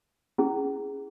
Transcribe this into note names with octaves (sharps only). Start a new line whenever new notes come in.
C#4 E4 G#4